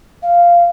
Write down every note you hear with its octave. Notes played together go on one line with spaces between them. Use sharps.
F5